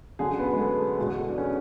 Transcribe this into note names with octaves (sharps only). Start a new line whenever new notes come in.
F#2 D3 F#3 G#4
B3
G#3
A3
E2 B2 G#3
A3
D4
C#4